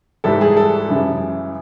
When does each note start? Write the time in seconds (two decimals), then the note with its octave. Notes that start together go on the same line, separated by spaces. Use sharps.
0.24 G#2 E3 G3 A4
0.41 G#4
0.57 A4
0.88 F#2 C#3 E3 G#3